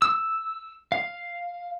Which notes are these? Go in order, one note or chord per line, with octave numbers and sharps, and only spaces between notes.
E6
F5